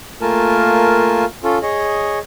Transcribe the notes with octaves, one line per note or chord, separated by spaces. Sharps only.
A3 A#3 F4 A#4 G#5 A5
C#4 F4 A4
G#4 C#5 D#5